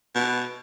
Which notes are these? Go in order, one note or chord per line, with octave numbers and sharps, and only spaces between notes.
B2